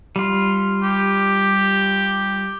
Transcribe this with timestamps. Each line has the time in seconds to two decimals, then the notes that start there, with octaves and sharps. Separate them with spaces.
0.16 G3 F4
0.83 G4